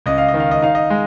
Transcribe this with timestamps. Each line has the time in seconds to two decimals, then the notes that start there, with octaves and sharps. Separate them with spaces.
0.06 C#2 D#5
0.18 F5
0.28 D#5
0.34 D#3
0.40 F5
0.51 D#5
0.62 D#4 F5
0.75 D#5
0.90 G#3